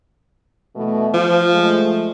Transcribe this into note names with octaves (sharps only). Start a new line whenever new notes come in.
B2 E3 A3
F3 F4
G#3 A3